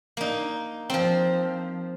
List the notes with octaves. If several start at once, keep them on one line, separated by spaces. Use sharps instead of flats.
A#3 D#4
F3 C4